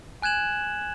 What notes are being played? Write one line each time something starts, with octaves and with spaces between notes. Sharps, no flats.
G#5 F#6 G#6 E7 F#7